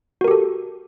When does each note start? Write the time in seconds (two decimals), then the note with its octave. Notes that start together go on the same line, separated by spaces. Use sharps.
0.21 F#4
0.24 A#4
0.28 G4
0.31 A4